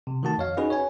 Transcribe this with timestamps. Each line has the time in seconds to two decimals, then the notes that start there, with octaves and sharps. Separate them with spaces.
0.07 C3
0.23 D#3 A3 F#4 A5
0.38 F2 C#5 F5
0.57 C#4 D#4 F#4 G#4 B4
0.70 C#5 G#5